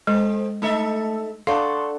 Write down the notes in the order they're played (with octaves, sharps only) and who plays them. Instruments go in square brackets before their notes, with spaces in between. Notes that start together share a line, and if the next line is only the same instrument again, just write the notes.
[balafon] G#3 [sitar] C4 [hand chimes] A4
[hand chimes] A3 [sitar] D#4 A4 E5
[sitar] D4 [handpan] A4 D5 F#5 [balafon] F5 [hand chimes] C6 C#6